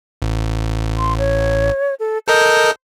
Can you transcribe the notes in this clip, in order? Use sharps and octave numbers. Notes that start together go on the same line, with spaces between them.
A1
C6
C#5
A4
A4 A#4 D#5 G6